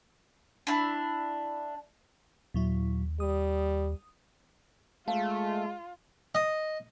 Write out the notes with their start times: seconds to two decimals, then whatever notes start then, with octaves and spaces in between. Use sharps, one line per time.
0.67 D4 E4
2.54 D#2 A#2 F#3 E4
3.20 G3 D#6
5.08 G#3 A3 F4 F5 A5
6.35 D#5